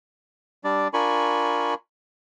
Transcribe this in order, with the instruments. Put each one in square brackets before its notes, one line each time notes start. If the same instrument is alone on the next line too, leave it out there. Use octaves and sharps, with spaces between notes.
[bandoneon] G3 D4 D5
D4 F4 A#4 G#5 B5 C#6